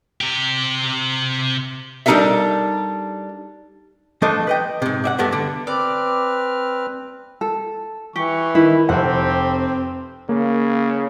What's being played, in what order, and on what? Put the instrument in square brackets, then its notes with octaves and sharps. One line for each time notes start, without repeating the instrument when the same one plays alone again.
[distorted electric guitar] C3 G4
[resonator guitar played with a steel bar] G3 D4 D#4 A4 A#4 E5
[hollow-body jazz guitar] F3 A3 D4 A4 C5 D#5
B4 D#5 G5
G#2 C3
D5 E5 F#5
G2 A3 B3
D3
[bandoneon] C4 B4 F6 [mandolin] D5
[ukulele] A4
[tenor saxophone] E3 [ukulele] G4 [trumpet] C#6
[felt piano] D#3 [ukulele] E4 [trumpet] B4
[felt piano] F1 [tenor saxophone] C4 [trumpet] G4 [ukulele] F#5
[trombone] C#3 [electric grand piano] A#3